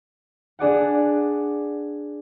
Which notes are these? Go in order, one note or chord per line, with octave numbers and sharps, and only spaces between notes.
D4 G#4 D5 F#5